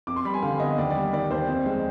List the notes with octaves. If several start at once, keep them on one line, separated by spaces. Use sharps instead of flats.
F2 D6
C6
G3 B5
G#5
D3 F5
B3 D#5
D#2 D5
D5
G3
D#3 D5
D#2 C5
F2
G#3